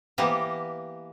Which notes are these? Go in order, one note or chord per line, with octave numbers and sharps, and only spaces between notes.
E3 A#3 B3 G4 A#4